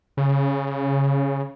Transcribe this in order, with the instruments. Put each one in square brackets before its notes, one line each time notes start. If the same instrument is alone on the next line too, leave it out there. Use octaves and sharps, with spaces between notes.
[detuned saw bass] C#3